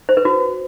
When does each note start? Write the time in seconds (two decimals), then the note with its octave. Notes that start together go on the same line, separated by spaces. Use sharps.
0.09 C5
0.17 B4
0.25 F#4